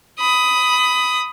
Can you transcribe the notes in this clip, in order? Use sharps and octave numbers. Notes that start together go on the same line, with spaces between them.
B5 D#6